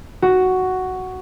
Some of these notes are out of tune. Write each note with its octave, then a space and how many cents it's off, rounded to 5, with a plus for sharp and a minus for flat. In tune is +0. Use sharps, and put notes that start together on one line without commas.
F#4 +5